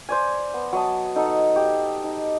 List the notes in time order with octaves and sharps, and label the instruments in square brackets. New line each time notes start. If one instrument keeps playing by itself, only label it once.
[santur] C5 D5 G#5
B3
F#3 D#5 A5
D#4 A4 F#5
G4
D#4